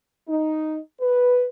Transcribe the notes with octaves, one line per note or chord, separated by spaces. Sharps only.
D#4
B4